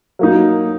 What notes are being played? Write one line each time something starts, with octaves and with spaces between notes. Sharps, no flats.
F#3 A#3 D#4